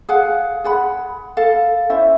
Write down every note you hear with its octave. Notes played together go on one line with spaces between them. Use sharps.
G#4 F5 F#5
G#4 F#5 B5
A4 F5
C#4 E4 C5 E5